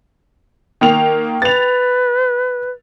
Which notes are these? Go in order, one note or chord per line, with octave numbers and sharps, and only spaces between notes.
D#3 A#3 F7
B4 A6 F7